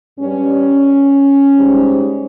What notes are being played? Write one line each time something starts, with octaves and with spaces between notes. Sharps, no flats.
G2 G3 C#4
G#2 G3